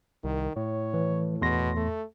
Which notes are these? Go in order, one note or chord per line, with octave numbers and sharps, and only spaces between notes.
C2 D#3
A2 C#5
E3
E2 B2 C6 A#6
A3